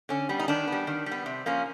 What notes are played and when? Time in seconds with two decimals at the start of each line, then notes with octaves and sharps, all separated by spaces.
0.09 D3 C#4
0.29 G3 B3
0.40 D#4
0.48 D#3 D4
0.67 G3 B3
0.87 D#3
1.06 G3
1.12 B3
1.26 C3
1.46 F3 A#3 C#4